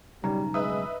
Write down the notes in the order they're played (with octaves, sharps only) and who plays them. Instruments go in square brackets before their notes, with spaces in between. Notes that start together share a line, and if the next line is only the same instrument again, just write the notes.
[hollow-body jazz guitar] B1 G2 C#3 [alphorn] G3 [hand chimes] D#4 A#5
[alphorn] G#3 [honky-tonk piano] D#4 B4 E5 [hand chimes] D#6